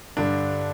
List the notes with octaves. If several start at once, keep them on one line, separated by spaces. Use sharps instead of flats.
G2 D3 D4